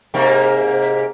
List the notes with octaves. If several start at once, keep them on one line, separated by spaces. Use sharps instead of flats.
G#2 C3 A#3